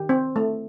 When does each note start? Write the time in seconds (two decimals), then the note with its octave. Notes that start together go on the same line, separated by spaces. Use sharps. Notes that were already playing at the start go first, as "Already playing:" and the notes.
Already playing: D#3 G4
0.09 C4
0.36 A3